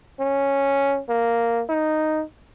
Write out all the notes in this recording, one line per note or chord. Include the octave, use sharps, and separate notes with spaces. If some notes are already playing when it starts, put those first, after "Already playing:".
C#4
A#3
D#4